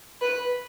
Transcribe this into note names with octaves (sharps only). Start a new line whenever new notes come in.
B4